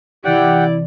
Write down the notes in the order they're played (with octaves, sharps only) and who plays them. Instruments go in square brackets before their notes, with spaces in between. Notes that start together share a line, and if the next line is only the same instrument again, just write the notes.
[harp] C3 E3 [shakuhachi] E4 [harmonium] G4 F#5 G5 [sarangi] D5